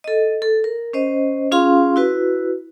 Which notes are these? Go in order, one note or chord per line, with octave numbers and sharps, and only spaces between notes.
A4 D#5
A4
A#4
C#4 C5 D#5
C#4 F4 G#4 F5 C6
E4 F#4 B4